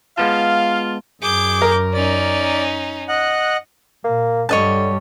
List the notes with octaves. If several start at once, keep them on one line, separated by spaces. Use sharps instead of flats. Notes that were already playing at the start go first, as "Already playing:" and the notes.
G#3 B3 F4 F5 A5
F#2 G#4 D6 G6
A#4
C#4 D#4 D5
D#5 F#5 F#6
A#2 A#3
G2 D3 G3 C#5 D#5 A5